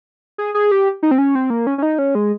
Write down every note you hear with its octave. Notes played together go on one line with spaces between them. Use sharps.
G#4
G#4
G4
D#4
C4
C#4
C4
A#3
C#4
C#4
D#4
C#4
G#3